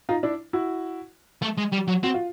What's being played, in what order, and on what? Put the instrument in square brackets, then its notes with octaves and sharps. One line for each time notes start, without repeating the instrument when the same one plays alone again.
[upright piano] D#4 F4
D4 E4
E4 F#4
[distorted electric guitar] A3
G#3
G3
F#3
[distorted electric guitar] C4 [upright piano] F#4
[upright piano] F4